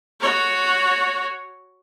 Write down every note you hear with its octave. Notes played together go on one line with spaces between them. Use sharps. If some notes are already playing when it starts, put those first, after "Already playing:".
F#4 C#5